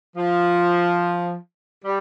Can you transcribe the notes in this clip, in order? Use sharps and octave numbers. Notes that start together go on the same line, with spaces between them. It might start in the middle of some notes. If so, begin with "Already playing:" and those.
F3
G3